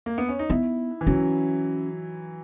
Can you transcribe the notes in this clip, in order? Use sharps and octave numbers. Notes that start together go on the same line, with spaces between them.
A#3
B3
C#4
D#4
B3 E4
E3
F#3 C#4